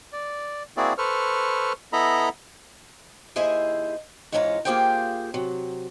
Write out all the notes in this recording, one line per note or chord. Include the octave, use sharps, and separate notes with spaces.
D5
A#3 C4 E4 F#4 G#4 D5
A4 B4 C5 C#6 F6
B3 E4 A4 D#5 A#5 B5
D#2 E4 G#4 C5 D#5 E5
G#2 E3 G#3 C#4 F4 A#5
A#3 F4 G4 G#4 C5 G5
C3 F#3